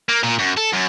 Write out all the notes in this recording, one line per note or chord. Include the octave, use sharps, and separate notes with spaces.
A#3
A#2
F#2
A4
F#2